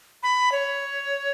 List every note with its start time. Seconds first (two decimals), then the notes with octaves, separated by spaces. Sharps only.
0.23 B5
0.52 C#5